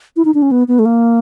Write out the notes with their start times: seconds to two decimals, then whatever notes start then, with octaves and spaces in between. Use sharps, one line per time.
0.16 E4
0.25 D#4
0.34 D4
0.42 C#4
0.51 B3
0.68 B3
0.79 A3
0.85 A#3